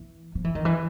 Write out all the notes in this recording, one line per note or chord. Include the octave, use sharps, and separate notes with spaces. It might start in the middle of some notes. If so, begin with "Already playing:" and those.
Already playing: E3
F3
E3
D#3
E3